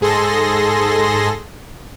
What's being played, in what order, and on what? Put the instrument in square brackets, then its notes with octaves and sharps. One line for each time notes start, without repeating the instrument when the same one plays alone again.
[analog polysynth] G#2 G#4 A4 C6 A#6